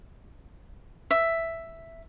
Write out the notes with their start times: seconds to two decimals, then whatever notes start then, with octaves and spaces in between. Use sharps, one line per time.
1.11 E5